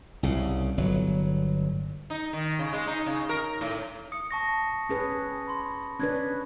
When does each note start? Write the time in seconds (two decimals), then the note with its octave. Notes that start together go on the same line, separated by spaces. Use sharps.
0.23 C2 C#3
0.78 G1 F#3
2.10 D#4
2.33 D#3
2.59 C#3
2.73 G#3
2.87 D#4
3.06 C#3
3.29 A#4
3.61 A2
4.12 D#6 C#7
4.31 A5 C#6 A#6
4.89 C#4 G#4 B4
5.48 B5 C6
6.00 C#4 D4 B4 F#6 G#6